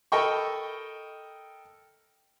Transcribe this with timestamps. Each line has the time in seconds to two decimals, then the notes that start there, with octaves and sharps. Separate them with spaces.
0.12 A4 A#4 D#5 G5 B5 C#6